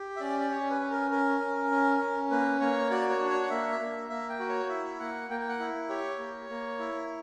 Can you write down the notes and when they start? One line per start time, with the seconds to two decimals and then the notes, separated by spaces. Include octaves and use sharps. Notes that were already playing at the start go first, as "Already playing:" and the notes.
Already playing: G4
0.16 E5
0.20 C#4 D5
0.40 D5
0.51 C#4 C#5
0.70 B4
0.81 C#4
0.90 A#4
1.10 C#4 A#4
1.40 C#4
1.71 C#4
2.00 C#4
2.31 A#3 B4
2.60 A#3 C#5
2.90 F#4 D5
3.09 C#5
3.21 D4
3.29 C#5
3.43 F#5
3.50 A#3 E5
3.80 A#3
4.09 A#3 E5
4.29 G5
4.39 F#4
4.49 C#5
4.69 E4 E5
4.99 A#3 F#5
5.29 A#3 G5
5.40 G5
5.49 F#5
5.60 E4
5.89 G4 C#5
6.19 A#3
6.49 A#3
6.79 E4